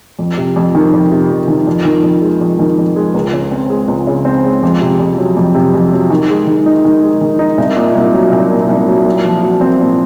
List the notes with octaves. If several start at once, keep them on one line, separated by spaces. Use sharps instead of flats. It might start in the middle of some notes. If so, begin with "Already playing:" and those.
F2
C3
F2
D#3
F2
C3
F2
D#3
F2
D#3
F2
G#3
F2
D#3
F2
G#3
C#2
C#3
C4
G#3
C#2
C#3
C4
G#3
F2
C3
F2
F#3
F2
C3
F2
F#3
D#3
G#3
D#3
D#4
D#3
G#3
D#3
D#4
C2
A#2
C2
F#3
C2
A#2
C2
F#3
A#2
F3
F#4
C4
A#2